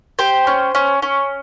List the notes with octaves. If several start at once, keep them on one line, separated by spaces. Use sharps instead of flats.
G4 C5
C#4
C#4
C#4